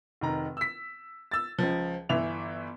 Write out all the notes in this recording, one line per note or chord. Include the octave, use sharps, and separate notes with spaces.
F1 D#3 A#5
E6 B6
E6 A6
C#2 F3
G1 E3 E5 F7